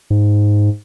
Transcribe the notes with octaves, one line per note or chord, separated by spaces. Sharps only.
G#2